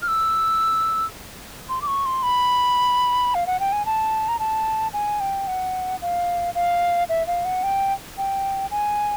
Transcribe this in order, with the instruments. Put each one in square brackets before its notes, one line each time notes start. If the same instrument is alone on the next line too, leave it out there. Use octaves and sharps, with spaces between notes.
[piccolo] F6
E6
C6
D6
C#6
C6
B5
F5
F#5
G5
G#5
A5
A#5
A5
G#5
G5
F#5
F5
F5
E5
F5
F#5
G5
G5
G#5